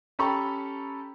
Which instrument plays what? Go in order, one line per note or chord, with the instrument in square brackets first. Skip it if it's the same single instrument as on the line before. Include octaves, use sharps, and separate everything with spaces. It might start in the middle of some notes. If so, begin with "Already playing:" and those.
[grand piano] C#4 G4 A4 A#5 B5 C#6